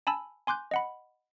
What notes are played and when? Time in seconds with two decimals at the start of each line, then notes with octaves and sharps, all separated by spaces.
0.07 G#5 A5 B5 E6
0.47 G#5 C6 D6 F#6 G6
0.71 D#5 F#5 B5